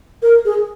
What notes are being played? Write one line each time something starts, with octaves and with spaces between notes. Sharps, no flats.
A#4
G#4